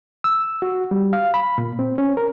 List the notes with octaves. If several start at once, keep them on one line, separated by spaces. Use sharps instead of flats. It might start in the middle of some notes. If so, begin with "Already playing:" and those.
E6
F#4
G3
F5
B5
A#2
C4
C#4
A#4